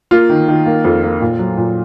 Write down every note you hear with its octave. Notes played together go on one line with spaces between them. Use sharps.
A#3 F4
D#3
D#3
A#3
F2
A#3
A#2
F#3
A#2